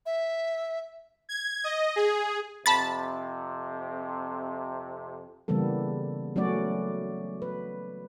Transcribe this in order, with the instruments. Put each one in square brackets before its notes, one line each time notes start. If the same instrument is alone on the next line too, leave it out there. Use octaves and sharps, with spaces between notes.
[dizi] E5
[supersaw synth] G#6
D#5
G#4
[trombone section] F2 C3 [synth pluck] A5 B5 A6
[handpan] C#3 E3 G3 A#3 B3 A4
F#3 A3 B3 C#4 F#4 D5
B4